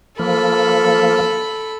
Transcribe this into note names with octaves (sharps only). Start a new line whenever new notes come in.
F3 A#3 A4 B5